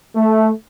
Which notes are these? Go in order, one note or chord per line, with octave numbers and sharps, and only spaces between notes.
A3